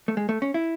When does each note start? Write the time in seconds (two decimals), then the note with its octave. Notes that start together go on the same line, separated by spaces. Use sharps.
0.08 A3
0.17 G#3
0.29 A3
0.42 C#4
0.54 E4